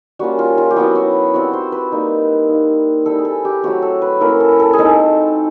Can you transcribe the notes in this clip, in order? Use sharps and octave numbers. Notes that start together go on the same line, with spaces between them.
G3 A#3 C#4 F4 F#4
F4
F4
G4
F#3 B3 E4 F#4
F#4
G3 C4 F4 F#4
C5
B4
G3 A#3 D#4
A#3 D#4
G3 C4 E4 A4
G#4
A4
G4
F#3 A3 C4 F#4
A4
B4
A#3 C#4 E4 A#4
A4
A4
G#4
G#3 C4 D#4 A4